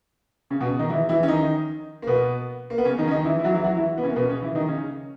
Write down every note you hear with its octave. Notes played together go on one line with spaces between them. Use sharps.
C#3 C#4
B2 B3
D#3 D#4
E3 E4
E3 E4
C#4
D#3 D#4
A#3
B2 B3
A#3
B3
C#3 C#4
D#3 D#4
C#4
D#3 D#4
E3 E4
E4
F#3 F#4
E3 E4
F#3 F#4
E3 E4
B3
C#3 C#4
A#3
B2 B3
C#3 C#4
E3 E4
D#3 D#4
C#3 C#4